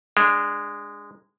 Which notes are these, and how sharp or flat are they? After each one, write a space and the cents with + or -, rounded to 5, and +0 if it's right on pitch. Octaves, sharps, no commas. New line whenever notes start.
G#3 -15 D4 +0